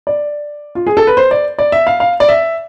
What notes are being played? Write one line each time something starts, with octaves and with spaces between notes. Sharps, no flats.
D5
F4
G#4
A4
B4
C5
D5
D5
E5
F5
F5
D5
E5